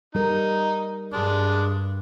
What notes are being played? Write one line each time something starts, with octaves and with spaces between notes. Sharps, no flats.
G3 D#4 A#4
G2 G#3 D4